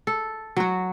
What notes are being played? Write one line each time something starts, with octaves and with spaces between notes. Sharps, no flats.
A4
F#3 F#4